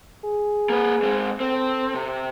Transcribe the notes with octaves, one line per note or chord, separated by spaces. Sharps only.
G#4
A#3 B4
G#3 C4
C4 A4
C3